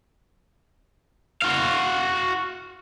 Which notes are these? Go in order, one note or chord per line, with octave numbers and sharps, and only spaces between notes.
F#4 F5